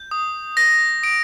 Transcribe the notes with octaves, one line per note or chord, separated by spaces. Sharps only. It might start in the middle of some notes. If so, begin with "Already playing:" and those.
Already playing: G6
D#6
G6 A#6
D#6 D7